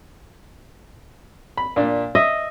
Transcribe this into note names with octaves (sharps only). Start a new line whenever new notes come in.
B5
A#2 D4
D#5 E5